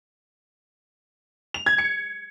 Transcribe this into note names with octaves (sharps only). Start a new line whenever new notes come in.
F7
G#6
C#7